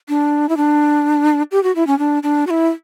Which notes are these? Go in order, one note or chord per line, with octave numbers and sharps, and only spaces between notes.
D4
E4
D4
G4
F#4
E4
C#4
D4
D4
F#4
E4